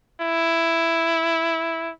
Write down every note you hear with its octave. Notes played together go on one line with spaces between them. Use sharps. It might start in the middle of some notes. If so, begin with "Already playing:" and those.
E4